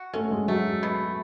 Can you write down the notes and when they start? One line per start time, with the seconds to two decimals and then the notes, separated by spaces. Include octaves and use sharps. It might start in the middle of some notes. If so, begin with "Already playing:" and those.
Already playing: F#4
0.13 A3 C#4
0.31 G#3
0.48 F#3 A3
0.83 B2